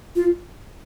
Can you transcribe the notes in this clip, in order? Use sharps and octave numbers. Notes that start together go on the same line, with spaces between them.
F4